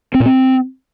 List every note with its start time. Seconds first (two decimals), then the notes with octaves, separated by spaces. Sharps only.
0.14 C4
0.20 A#2
0.26 C4